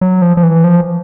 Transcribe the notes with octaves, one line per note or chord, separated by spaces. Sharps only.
F#3
F3
F3
E3
F3